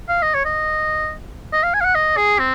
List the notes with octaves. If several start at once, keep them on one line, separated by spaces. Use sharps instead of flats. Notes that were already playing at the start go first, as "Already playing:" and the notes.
F5
D#5
C#5
D#5
D#5
F5
G#5
F5
F#5
D#5
G#4
C4